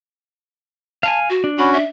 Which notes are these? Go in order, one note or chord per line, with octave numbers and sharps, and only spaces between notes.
F5 G#5 A5
F#4
D4
C#4 F#4 B5
E5